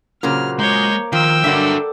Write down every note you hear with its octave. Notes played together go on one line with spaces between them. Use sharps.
A#2 C#3 F#3 A#3 C5 F6
G#3 C#5 A#5 D6 G6
D#3 F3 G5 E6
G2 D3 F#3 A4 A#4 D5 E5 F#5